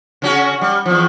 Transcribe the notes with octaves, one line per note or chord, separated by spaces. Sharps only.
C#3 C#4 F#4
G3
E2 F3